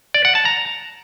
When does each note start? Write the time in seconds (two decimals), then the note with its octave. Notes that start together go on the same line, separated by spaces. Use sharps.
0.14 D5
0.25 F#5
0.35 A5
0.45 A#5